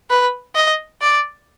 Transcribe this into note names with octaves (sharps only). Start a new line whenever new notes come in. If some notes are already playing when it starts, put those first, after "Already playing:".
B4
D#5
D5